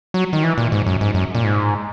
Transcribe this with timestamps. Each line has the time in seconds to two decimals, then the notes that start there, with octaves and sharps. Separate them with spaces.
0.14 F#3
0.33 D#3
0.43 E3
0.58 A#2
0.72 G#2
0.86 F#2
1.01 G#2
1.14 F#2
1.35 A#2
1.44 G#2